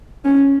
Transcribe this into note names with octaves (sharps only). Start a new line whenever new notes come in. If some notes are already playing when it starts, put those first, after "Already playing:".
C#4